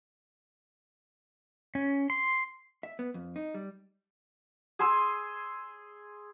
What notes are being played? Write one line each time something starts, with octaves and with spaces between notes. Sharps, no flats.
C#4
C6
E5
B3
F2
D#4
G3
G#4 G#5 C6 E6